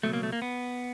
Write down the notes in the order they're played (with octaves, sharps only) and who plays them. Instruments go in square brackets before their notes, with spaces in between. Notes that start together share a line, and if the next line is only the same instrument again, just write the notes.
[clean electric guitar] C#2 B2 F#3 A3
A#3
A3
A#3
B3